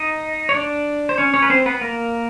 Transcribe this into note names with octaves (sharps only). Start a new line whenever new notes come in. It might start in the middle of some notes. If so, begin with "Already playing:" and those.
Already playing: D#4 D#5
C#5
D4 D5
C5
C#4 C#5
C#4 C#5
B4
C4 C5
B3 B4
A#3 A#4